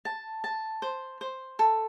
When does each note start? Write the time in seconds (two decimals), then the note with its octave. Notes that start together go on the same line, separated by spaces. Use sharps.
0.05 A5
0.44 A5
0.82 C5
1.21 C5
1.59 A4